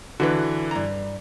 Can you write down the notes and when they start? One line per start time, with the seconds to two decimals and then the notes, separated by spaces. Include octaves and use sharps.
0.20 D3 E3 F#4 B4
0.71 G2 A#5